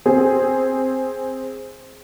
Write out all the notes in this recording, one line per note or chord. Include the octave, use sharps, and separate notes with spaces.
C4 G#4